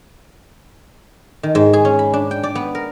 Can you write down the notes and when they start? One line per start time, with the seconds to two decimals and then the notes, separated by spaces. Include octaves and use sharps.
1.43 D#3
1.55 G#2
1.73 G#4
1.85 C#4
1.99 B5
2.13 D4
2.31 G5
2.43 D5
2.55 B3
2.75 A#4